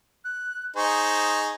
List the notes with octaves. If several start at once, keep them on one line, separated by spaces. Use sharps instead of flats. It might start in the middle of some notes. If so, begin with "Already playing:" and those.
F#6
D#4 G#4 C5 C#6